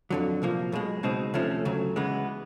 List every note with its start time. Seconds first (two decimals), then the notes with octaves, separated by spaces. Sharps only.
0.10 F2 D3 F#3
0.42 C2 A#2 F3 A#3
0.72 B1 B2 G#3
1.03 C#2 B2 G#3 C4 D#4
1.34 D2 C3 F3 A3 C#4
1.65 D2 C#3 F#3
1.96 C#3 E3 G#3 B3